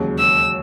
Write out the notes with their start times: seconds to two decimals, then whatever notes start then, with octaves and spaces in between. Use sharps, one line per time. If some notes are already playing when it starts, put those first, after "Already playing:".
Already playing: E1 D#2 C#3 F#3
0.19 E6